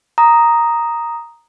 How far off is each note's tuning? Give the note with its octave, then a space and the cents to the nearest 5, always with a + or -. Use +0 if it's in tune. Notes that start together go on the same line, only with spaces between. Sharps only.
A#5 +0 D#6 +0